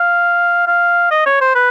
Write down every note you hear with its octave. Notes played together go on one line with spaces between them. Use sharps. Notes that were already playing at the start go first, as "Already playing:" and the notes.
Already playing: F5
F5
D#5
C#5
C5
B4